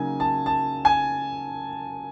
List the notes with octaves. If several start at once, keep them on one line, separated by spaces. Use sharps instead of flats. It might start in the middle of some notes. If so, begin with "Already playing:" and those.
Already playing: C#3 F#3 A#3 D#4 G#5
A5
A5
G#5